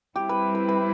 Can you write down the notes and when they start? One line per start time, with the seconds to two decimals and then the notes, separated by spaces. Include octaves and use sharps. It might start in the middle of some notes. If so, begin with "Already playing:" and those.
0.16 G3 C4 E4 G4
0.29 B4
0.55 B4
0.69 B4